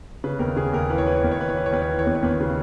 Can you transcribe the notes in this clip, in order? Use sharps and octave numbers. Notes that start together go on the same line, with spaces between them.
C#3 B4
D#2 A#4
C#3 G#4
D#2 A#4
E3 B4
C#5
E3 B4
C#5
D#2 B4
C#5
E3 B4
C#5
E3 B4
C#5
D#2 B4
C#5
E3 B4
C#5
D#2 B4
C#5
D#2 B4
C#3